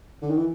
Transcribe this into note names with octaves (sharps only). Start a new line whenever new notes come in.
D3
D#3
E3